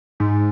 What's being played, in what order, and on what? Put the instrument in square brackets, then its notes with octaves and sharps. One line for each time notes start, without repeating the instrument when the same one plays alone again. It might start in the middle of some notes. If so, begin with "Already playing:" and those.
[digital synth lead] G#2